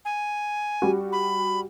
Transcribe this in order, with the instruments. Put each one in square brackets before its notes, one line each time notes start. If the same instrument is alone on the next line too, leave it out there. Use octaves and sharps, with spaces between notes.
[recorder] G#5
[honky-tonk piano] G3 F#4
[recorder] B5